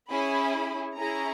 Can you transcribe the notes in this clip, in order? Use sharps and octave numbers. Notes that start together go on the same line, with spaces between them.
C#4 E4 G#4 B5
C#4 E4 G#4 A#5